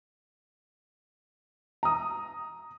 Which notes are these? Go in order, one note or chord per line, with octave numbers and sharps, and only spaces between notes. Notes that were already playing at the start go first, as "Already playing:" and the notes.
A#5 D#6